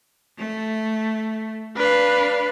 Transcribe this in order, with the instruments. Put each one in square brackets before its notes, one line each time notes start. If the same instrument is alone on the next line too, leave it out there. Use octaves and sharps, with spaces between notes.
[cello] A3
[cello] D4 F5 [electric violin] B4